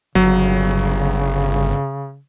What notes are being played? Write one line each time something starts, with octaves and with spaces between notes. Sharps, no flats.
G1 C#3 F#3